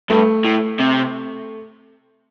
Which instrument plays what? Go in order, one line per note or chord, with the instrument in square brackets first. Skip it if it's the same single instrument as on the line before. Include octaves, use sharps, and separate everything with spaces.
[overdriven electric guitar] G2 [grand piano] A3
[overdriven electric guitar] A2
C3